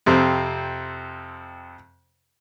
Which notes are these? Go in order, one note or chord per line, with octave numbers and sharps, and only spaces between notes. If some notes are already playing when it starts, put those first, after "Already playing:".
F2 C3 C4